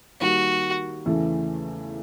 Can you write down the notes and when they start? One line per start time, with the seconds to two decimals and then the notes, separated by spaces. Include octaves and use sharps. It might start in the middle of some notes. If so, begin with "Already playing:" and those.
0.21 D#3 G3 A#3 F#4
1.06 E2 C#3 E3 A3